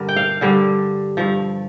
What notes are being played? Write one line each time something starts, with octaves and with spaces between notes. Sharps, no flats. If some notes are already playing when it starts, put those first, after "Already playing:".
Already playing: G2 D3 G3 A#4
G5
F5
G2 D3 G3
G2 F3